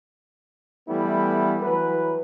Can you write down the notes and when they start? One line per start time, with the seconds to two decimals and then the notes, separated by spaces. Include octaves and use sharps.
0.88 E3 G3 A3 B3 E4
1.61 E3 F#3 B4